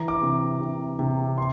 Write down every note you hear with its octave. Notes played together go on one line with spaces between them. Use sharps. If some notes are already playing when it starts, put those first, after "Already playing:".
Already playing: E3 A#5
D6
C3
C3
C3
C6